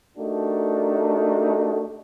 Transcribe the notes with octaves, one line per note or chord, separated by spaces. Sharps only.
A3 D4 D#4 F#4 G4 A#4